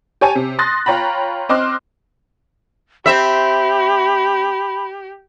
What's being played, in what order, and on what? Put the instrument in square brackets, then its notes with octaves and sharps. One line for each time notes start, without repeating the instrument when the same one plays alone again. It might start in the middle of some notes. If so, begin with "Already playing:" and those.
[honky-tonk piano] G4 C#5 G#5 A5
C3
C6 D#6 F#6 A6 A#6
F4 C#5 G5 A#5 B5
C4 D#5 C6 D6 F6 F#6
[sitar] C4 E5 [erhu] G4 [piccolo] B5